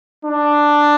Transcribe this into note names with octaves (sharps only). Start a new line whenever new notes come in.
D4